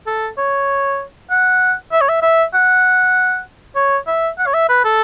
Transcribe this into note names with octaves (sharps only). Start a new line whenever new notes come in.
A4
C#5
F#5
E5
C#5
E5
E5
F#5
C#5
E5
F#5
C#5
E5
B4
A4